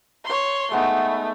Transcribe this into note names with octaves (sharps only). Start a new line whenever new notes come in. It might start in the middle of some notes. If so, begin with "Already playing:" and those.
C#5 C6
G#3 A3 B3 D#4